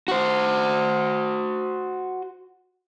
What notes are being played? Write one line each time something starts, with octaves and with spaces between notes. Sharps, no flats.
F#4 C5